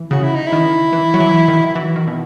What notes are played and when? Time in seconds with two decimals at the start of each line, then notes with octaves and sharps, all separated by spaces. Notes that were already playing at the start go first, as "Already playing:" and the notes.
Already playing: E3
0.11 C#3 F#4
0.23 E4
0.35 D#4
0.47 E4
0.52 D#3
0.93 E3
1.14 F#3
1.20 E3
1.48 D#3
1.67 E4
1.75 E3 F#4
1.96 D#3
2.07 B2